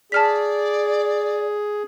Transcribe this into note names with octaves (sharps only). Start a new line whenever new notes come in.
G#4 D5 A5 F6 B6